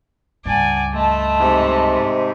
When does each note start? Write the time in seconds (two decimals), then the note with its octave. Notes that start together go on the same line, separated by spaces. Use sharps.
0.45 C#2 G2 D5 F#5 G#5 A5
0.93 A3 D#5 A5 B5 C6
1.39 G#2 C3